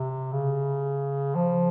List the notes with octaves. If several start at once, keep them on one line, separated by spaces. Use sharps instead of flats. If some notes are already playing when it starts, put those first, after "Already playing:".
Already playing: C3
C#3
F3